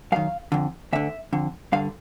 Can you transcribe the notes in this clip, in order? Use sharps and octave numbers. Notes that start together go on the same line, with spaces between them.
F#2 D#3 F5
F2 D3
D2 D3 E5
F2 D3
G2 D3 F5